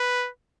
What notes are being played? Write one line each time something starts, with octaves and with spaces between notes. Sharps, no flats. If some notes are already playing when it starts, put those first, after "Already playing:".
Already playing: B4